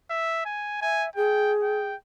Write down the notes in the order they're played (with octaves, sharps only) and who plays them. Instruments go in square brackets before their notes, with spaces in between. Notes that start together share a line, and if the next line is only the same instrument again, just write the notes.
[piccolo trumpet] E5
G#5
[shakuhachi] E5 [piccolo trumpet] G#5
[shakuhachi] G#4 [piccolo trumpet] G5
[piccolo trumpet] G5